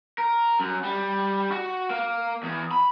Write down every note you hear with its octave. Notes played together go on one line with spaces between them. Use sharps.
A#4
F#2
G3
F#4
A#3
E2
B5